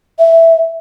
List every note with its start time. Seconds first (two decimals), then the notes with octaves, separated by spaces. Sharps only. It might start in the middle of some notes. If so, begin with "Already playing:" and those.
0.19 E5